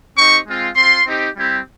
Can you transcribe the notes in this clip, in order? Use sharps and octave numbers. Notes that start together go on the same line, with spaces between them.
C4 D#4 G4 C#6
G#3 C4 F4
C4 F4 C6
C4 D#4 G4
G3 C4 E4 G4